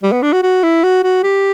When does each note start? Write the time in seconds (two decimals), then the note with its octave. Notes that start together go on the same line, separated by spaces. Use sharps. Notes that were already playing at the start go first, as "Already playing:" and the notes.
0.03 G3
0.12 B3
0.22 D4
0.33 F#4
0.43 F#4
0.63 E4
0.83 F#4
1.03 F#4
1.23 G4